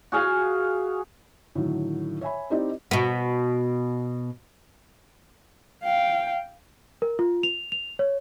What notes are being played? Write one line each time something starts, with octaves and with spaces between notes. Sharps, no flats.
F#4 G#4 F5 G#5
A2 D3 D#3 F#3
C#5 E5 G#5 B5
C4 D#4 E4 G4 C5 D5
B2 B3
F5 G5
A#4
F4
F7
F7
C#5